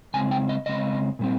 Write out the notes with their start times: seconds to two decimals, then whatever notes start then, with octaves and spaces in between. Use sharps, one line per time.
0.14 C#3 G#3 C4 G#5
0.31 G5
0.49 D#5
0.66 C#3 G#3 C4 D#5
1.19 A#2 G3 C4